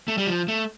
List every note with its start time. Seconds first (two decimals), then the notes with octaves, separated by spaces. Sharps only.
0.08 A3
0.18 G3
0.27 F3
0.48 A3